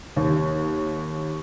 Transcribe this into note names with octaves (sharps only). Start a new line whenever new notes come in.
D#2